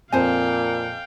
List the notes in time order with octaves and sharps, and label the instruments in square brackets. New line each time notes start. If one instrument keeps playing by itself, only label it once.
[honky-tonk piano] F2 [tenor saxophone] A#2 [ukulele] C5 G#5 [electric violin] F5 G5